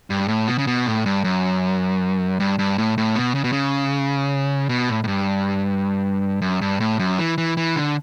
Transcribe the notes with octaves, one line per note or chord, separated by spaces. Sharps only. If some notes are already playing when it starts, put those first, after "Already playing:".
G2
A2
B2
C#3
B2
A2
G2
F#2
G2
G2
A2
A2
B2
C#3
B2
C#3
B2
A2
A2
G2
F#2
G2
A2
F#2
E3
E3
E3
D3